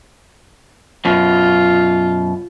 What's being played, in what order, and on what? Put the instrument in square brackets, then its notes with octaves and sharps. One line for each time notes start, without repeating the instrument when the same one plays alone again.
[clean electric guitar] F#2 B2 [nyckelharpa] F4